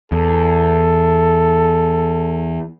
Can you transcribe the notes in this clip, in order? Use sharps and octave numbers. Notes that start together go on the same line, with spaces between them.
E2 A4